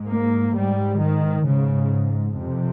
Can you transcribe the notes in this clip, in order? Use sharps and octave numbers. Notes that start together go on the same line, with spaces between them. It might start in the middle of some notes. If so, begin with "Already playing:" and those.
Already playing: G#2
A#3
G#2 G3
D#3
G#2 C#3
F2 C3